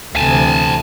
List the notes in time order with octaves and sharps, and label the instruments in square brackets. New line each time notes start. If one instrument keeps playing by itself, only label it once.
[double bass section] D2 C3 E3 [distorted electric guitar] G#5 A5